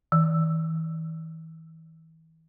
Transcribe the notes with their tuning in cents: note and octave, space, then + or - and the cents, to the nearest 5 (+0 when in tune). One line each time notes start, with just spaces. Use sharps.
E3 -40